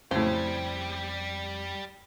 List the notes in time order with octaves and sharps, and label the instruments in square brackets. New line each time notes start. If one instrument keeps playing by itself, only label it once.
[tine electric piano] F2 G#6 [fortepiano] A2 C#3 [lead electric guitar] G3 G4 [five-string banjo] C5